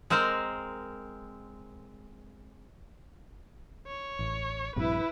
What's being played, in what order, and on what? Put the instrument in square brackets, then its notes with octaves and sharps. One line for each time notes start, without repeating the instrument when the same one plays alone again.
[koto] G#3 C4 A#4 C5
[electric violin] C#5
[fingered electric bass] A1
[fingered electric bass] A#1 G2 C3 [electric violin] E4 B4